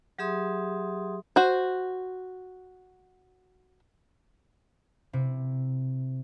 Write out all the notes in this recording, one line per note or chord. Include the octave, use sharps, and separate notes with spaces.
F#3 G4 G#4 E5 C6 D#6
F#4 C5
C3 E4